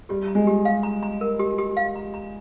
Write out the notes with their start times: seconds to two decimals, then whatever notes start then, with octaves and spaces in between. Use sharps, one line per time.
0.09 G3 G4
0.28 A#5
0.35 G#3
0.47 G4
0.65 F5
0.83 A#5
1.03 A#5
1.21 A#4
1.39 G4
1.58 G4
1.77 F5
1.96 A#5
2.14 A#5